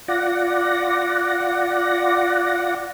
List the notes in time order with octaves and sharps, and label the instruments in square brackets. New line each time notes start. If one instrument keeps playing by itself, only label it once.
[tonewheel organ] F4 D5 F#5 A#6